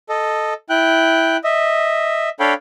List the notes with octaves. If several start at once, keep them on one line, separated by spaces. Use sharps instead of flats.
A4 D#5
E4 G5 F#6
D#5 E5
D4 A4 C#5 F5 G5 B5